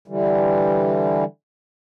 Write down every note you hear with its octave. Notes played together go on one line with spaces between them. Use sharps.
D3 E3 G3